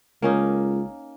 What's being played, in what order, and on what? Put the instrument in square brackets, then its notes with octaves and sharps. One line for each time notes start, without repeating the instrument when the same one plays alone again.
[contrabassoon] C#2 [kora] A#3 C#4 D#4